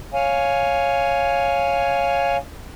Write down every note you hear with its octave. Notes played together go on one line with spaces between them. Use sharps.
C#5 F5 G#5